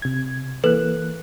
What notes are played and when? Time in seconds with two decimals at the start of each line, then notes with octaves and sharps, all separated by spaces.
0.02 C3 G#6
0.64 E3 A#3 A4 B4 F#6